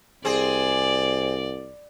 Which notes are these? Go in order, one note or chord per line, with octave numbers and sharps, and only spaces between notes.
C2 C4 G#4 D5